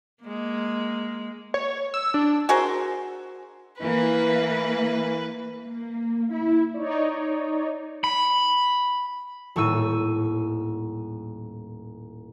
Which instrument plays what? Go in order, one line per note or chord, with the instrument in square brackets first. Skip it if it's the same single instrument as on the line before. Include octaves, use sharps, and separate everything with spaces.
[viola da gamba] G#3 A#3
[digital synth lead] C#5
E6
D4
[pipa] F#4 G#4 A#4 C5
[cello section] E3 A#3 [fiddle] B4
[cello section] A#3
E4
[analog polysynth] D#4 C#5 D5
[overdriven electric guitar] B5
[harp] D#1 A2 C#6 E6 D#7